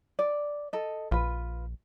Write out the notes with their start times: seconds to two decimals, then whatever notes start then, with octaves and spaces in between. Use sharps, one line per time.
0.19 D5
0.73 A4 D#5
1.11 A#1 F4 B4